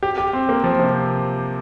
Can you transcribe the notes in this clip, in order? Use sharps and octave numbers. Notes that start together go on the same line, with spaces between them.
G4
G4
C4
A#3
F3
C3